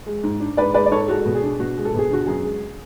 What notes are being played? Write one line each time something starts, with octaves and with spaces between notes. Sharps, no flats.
G#3
G#2
D4
G#2 B4 D5
G#3 B4 D5
D5
G#2 A4 C#5
G#3 F#4 A4
B2
G#4
D4
B2 F#4
G#3
A4
B2 G#4
D3 F#4
F#2 G#4
G#3